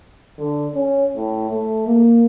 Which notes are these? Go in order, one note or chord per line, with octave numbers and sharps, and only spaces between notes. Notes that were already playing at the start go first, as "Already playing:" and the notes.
D3
C#4
A2
A3
A#3